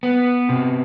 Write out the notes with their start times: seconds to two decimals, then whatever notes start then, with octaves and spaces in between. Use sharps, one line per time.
0.03 B3
0.49 C3